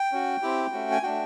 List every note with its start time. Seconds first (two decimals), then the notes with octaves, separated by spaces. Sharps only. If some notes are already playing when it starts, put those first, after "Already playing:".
Already playing: G5
0.12 C#4 F#4
0.42 C4 E4 G4
0.72 A3 C#4 F#4
0.91 G#5
1.03 A3 D4 F#4 G5